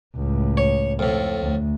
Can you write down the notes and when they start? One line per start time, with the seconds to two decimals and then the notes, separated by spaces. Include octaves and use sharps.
0.15 C#2 A2
0.57 C#5
0.99 F2 A2
1.42 D2